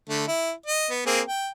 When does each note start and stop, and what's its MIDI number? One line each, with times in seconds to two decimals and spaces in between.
0.09 0.25 50
0.09 0.25 57
0.28 0.51 64
0.66 0.89 75
0.90 1.04 59
1.06 1.21 58
1.06 1.21 60
1.06 1.21 68
1.26 1.49 79